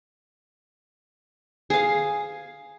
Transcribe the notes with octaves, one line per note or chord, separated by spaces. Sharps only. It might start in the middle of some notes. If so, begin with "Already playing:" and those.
G#4 F5